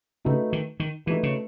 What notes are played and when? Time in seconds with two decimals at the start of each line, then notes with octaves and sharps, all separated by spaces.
0.25 C#3 A3 D#4 F#4 B4
0.53 D#3
0.80 D#3
1.06 E3 A3 D#4 F#4 B4
1.23 C#3